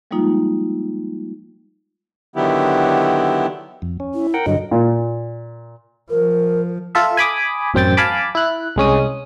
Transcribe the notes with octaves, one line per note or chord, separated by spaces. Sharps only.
F3 G3 G#3 A#3 D#4 F4
D3 D#3 F#3 B3 E4 G4
F2
C#4
E4
A#4 F#5 G5
G2 D3 F#3 D#5
A#2
F3 A#4
F4 A4 E5
G#5 B5 D6 D#6
A1 F#2 C4 G5 A6
F5 G#5 A5 B5 D6
E4 F#6
C2 G#3 C#4 D#6